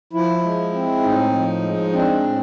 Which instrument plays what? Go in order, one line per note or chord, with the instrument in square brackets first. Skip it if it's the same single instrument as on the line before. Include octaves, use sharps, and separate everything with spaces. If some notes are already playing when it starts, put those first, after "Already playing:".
[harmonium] F3 E4
G#3
C4
A2 D#4
F3
G#3
C4 D4
A2